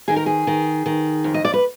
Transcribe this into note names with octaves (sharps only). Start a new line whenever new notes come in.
D#3 G#4
A#4
G#4
D#3
D#3
F2
D#5
D5
B4